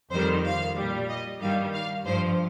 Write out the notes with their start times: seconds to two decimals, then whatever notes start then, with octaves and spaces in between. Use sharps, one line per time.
0.11 F2 D#3 G3 C5
0.44 F5
0.77 A#2 G3
1.09 D#5
1.40 G2 D#3 G3 F5
1.73 F5
2.06 G2 F3 C5